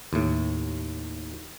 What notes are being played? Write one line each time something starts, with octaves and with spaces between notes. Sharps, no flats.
D#2 A2